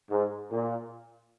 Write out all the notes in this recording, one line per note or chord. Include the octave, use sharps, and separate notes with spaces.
G#2
A#2